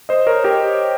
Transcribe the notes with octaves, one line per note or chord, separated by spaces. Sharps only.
C5 D#5
A#4 C#5
G4 A#4